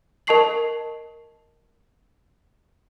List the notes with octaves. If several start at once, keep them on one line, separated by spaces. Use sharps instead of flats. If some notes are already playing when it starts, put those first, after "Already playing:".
A#4 D#5 A5 C#6 C7 F#7